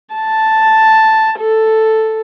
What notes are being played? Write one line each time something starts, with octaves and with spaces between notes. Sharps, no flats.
A5
A4